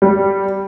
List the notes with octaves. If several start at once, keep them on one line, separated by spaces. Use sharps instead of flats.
G3